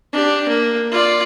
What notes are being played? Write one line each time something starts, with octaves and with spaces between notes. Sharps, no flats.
D4 G4
A#3
F4 D5